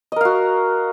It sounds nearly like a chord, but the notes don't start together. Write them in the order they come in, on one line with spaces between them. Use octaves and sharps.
D#5 A#4 F5 F#4